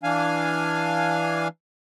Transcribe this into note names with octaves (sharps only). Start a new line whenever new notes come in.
E3 D4 F5 G#5